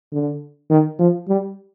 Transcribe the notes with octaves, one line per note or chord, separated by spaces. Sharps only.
D3
D#3
F3
G3